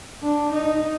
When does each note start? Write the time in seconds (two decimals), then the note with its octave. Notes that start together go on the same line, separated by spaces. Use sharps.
0.23 D4
0.52 D#4